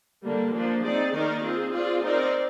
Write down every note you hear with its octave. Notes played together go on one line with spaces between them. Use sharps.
D3 G3 A#3
F3 A#3 D4
C4 D#4 G#4 D5
D#3 A#3 D#4 A#4 D5
C4 F4 G#4
C4 F4 G#4 D5
C4 D#4 A#4 D5